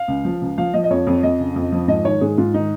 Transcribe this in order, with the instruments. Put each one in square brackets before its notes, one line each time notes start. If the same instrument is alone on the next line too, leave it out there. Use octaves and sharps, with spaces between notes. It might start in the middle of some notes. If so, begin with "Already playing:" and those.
Already playing: [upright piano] F5
C#2
F3
C#2
F3 F5
F3 D#5
D#5
F2 C#5
F2
F2 D#5
C#3
F2
F3
G#2 D#5
D#3 C#5
G#2 G#4
G#2 F4
D#3 D#4